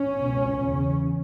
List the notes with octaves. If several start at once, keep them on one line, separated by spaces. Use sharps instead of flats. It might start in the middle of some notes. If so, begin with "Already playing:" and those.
Already playing: C#4
C#2 B2
E2 C#3